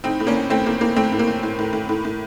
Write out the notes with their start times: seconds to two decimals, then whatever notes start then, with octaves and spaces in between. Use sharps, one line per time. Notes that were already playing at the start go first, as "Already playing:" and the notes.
0.04 A2 C4 D#4
0.20 A2
0.27 A#3 C#4
0.35 A2
0.50 A2 A3 C4
0.66 A2 A#3
0.81 A2 A#3
0.96 A2 A3 C4
1.12 A2
1.19 A#3
1.28 A2
1.43 A2
1.59 A2
1.73 A2
1.89 A2
2.05 A2